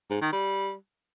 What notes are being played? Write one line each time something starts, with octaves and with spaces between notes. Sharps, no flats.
G#2
D#3
G3